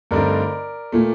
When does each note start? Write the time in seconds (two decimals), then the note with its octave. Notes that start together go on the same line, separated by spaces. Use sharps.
0.11 G2 D3 A3 C4 D#4 A#4 D5
0.92 A#2 A3